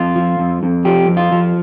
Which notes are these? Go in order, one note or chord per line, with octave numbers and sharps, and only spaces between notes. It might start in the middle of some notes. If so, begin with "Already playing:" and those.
Already playing: F2 F4
F3
F2
F2
F3 G4
F2
F4
F3